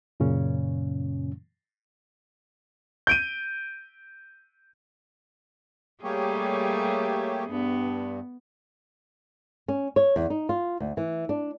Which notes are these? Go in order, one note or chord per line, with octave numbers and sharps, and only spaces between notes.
F#2 A#2 C#3 C#4
G6 D7 D#7
G3 A3 A#3 G4 G#4 C#5
G2 B3
C#4
C#5
E2
D#4
F4
D2
E3
D4